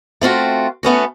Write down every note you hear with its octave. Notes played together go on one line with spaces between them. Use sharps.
A3 C4 F4 F#4
A3 B3 C#4 F#4